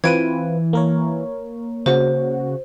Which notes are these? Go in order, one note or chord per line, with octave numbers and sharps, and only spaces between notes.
E3 C4 F4 B4 G#6 D7 D#7
A#3 A#4 C#5
C#3 F#4 C5